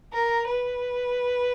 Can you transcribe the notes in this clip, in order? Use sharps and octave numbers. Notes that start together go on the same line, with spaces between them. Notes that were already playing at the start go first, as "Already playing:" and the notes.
A#4
B4